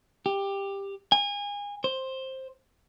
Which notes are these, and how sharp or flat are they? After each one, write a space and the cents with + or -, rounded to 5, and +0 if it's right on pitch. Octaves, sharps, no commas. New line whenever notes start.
G4 +15
G#5 -30
C5 +10